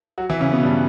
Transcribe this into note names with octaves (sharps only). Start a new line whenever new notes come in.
F#3 F#4
E3 E4
C#3 C#4
B2 B3
G2 G3